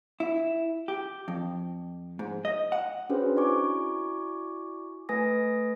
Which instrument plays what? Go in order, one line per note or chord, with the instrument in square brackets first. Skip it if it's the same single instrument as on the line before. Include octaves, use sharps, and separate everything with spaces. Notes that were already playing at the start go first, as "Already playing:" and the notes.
[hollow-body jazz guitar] E4
G4
F2
G#2
D#5
F#5
[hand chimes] C#4 D4 F#4 G#4 B4 C5
E4 F#4 D5 G#5 C#6 D6
A3 B4 G#5 D#6 A#6